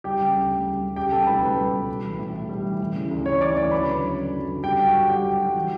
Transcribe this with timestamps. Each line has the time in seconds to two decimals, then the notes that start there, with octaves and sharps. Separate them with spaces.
0.04 G3 G4 G5
0.21 C#3
0.35 D2
0.50 D2
0.66 G3
0.82 C#3
0.96 G3 G4 G5
1.12 B2 A4 A5
1.27 C#2 B4 B5
1.42 C#2 B4 B5
1.58 G3
1.73 B2
1.88 G3
2.04 E3
2.19 A2
2.35 A2
2.49 G3
2.65 E3
2.80 E3
2.95 C#3
3.11 D2
3.26 D2 C#5 C#6
3.41 E3 D5 D6
3.57 C#3 D5 D6
3.71 F#3 B4 B5
3.87 D3
4.02 F#2
4.17 F#2
4.33 F#3
4.48 D3
4.63 G2 G4 G5
4.79 F#3
4.87 F#4 F#5
4.93 G2
5.09 F#3 G4 G5
5.24 G2
5.40 F#3
5.55 E3